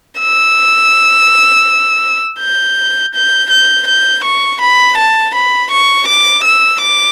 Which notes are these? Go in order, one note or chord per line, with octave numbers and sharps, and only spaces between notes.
E6
G6
G6
G6
G6
C#6
B5
A5
B5
C#6
D6
E6
D6